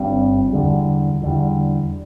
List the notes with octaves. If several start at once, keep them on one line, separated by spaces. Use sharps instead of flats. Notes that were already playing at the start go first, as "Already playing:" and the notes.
Already playing: G1 G2 G3 C4
E2 D3 G3
E2 D3 G3